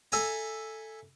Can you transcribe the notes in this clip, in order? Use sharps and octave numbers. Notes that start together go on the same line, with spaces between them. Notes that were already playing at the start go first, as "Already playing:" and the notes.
A4 E5 G#5 A#5